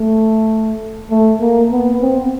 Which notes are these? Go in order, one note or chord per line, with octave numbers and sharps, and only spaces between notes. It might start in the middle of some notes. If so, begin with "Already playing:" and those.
Already playing: A3
A3
A#3
B3
C4